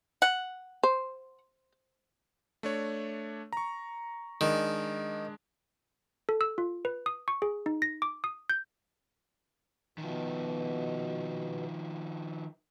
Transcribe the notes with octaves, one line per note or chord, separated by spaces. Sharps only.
F#5
C5
A3 D4 C#5
A#5 C#6
D#3 G#3 D4
A4
E6
F4
B4
D#6
C#6
G#4
D#4
A#6
D6
D#6
G6
B2 D#3 F3